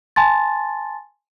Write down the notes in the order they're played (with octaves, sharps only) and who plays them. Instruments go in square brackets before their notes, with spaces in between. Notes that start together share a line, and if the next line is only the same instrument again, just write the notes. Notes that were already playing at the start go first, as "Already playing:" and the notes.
[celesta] G#5 A5 C6 A6